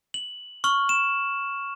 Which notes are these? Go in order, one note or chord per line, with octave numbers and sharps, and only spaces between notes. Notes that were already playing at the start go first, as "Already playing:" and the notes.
F#7
C#6 F6 F#7
E7